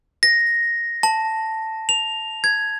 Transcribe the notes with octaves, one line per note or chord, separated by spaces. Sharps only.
A#6
A5
F7
G#6